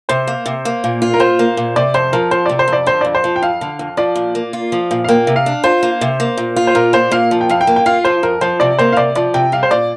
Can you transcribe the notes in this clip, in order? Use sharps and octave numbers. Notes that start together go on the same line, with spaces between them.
C3 C5
A#3
C3
A#3
A#2
F4
A#4
A#2 C5
A#3
A#2
C3 D5
F2 C5
F3 A#4
F2 C5
C3 D5
C5
F2
D5
D3 C5
F2 D5
C5
F3
G5
F2 F5
D3
F2
F3 D5
A#2
A#3
F4
F3
A#2
F5
A#3 G5
C3
F5
D4
F4 C5
A#3
C3
A#3
A#2
F4
C5
A#2 A#4
A#3 C5
A#2 F5
F3
G5
F2 F5
G5
A#3
G5
F4 F5
F3 C5
F2 A#4
F3 C5
C3 D5
A#3 C5
F5
C3 D5
F3 D5
C3 G5
G3 F5
C5
A#2 D5